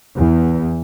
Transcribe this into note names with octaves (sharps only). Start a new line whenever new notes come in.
E2